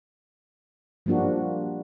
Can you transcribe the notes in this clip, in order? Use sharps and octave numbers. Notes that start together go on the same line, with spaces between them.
F3 G3 A#3 D4 F#4